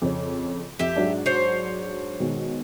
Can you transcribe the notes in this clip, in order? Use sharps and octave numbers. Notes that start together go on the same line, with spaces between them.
F2 C#3 C#5
F2 G4 E5
G#2 F#3 D4
C5 C#5
B2 D#3 G#3